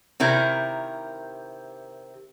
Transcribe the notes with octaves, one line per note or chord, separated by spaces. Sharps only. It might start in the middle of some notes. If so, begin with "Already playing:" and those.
C3 D#3 E4 A#4